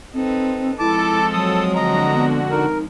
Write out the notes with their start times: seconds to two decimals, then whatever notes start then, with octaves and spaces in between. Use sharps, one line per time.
0.14 C4 D#4 A4 B4
0.79 F3 G#3 C4 E4 A4 A5 D6
1.33 F#3 D#6
1.75 D3 F#4 D#5 A#5
2.13 B3
2.51 D#4 A#4